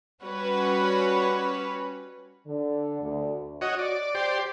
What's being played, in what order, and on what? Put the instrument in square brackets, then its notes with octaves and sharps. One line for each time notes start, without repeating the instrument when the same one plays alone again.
[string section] G3 C#4 F#4 B4 C#5
[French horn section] D3
D2
[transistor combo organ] F#4 C#5 D#5
D5
G4 C5 D5